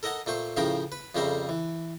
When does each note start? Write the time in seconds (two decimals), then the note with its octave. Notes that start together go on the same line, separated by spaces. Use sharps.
0.03 A4 A#4 D#5 F#5 G#5
0.26 A#2 A3 C5 C#6
0.57 A2 C#3 F3 C#4 A#4 G5
0.92 B4
1.15 F2 C#3 G3 A3 A#4 C5
1.49 E3